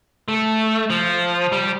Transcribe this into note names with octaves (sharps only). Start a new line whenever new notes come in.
A3
F3
G3